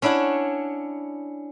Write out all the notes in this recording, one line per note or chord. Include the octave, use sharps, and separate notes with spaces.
C#4 D4 E4 C#5 F#5